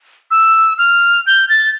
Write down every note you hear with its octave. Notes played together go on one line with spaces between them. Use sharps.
E6
F6
G6
A6